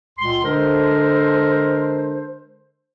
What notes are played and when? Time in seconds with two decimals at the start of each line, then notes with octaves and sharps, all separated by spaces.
0.18 C#2 A#2 C6
0.44 D3 G#3 D4 A4 A#4 C5